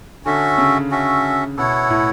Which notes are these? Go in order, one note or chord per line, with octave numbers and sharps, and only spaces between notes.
D3 C#4 F#4 A4 E5
C#3
C#4 F#4 A4 E5
B2 E4 A4 C#5 F#5
A2